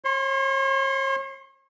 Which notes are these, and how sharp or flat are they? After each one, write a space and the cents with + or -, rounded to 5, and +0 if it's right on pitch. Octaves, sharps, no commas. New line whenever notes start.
C#5 -40 C6 +0